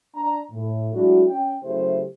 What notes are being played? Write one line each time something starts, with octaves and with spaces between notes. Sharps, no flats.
D4 A#5
A2
F#3 G#3 A3 D4 E4 F#4
C#4 G5
C#3 F#3 A3 E4 G4 C5